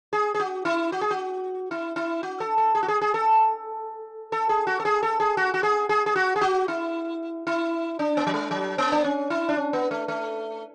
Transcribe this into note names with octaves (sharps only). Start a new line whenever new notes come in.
G#4
G#4
F#4
E4
F#4
G#4
F#4
E4
E4
F#4
A4
A4
G#4
F#4
G#4
G#4
A4
A4
G#4
F#4
A4
G#4
A4
G#4
F#4
F#4
G#4
G#4
G#4
F#4
G#4
F#4
E4
E4
D4
B3
F#3
G#3
F#3
B3
D4
C#4
E4
D4
C#4
B3
A3
A3